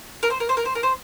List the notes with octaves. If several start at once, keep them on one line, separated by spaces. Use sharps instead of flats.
A#4
C5
A#4
C5
A#4
C5
A#4
C5